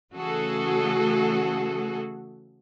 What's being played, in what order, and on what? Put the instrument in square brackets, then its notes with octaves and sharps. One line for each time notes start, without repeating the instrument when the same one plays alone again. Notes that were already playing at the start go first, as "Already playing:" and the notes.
[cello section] C#3 E3 A3 F#4 G#4 A4